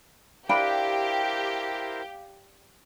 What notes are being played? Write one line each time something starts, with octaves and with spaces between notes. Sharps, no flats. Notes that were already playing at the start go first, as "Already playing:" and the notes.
D4 E4 G4 A#4 C5 F5 G5 B5